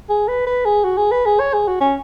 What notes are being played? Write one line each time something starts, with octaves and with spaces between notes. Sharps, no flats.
G#4
B4
B4
G#4
F#4
G#4
B4
G#4
C#5
G#4
F#4
C#4